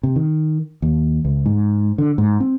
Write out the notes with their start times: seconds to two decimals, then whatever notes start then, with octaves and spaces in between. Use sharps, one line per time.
0.03 C3
0.16 D#3
0.82 D#2
1.25 C#2
1.46 G#2
1.98 D3
2.18 G#2
2.40 C4